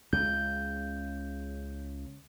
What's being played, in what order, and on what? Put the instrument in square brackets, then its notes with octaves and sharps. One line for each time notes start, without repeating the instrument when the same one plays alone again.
[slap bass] C#2 C#3 [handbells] G6